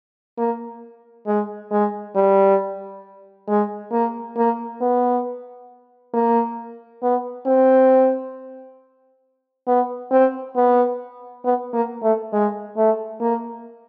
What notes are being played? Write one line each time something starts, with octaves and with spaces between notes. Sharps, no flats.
A#3
G#3
G#3
G3
G#3
A#3
A#3
B3
A#3
B3
C4
B3
C4
B3
B3
A#3
A3
G#3
A3
A#3